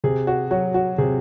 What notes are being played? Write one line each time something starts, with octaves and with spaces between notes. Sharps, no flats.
C3 G#4
F#4
F#3 F#4
F#4
C3 G#4